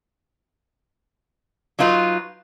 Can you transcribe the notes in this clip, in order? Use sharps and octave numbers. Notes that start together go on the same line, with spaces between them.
F#3 D#4 F4 B4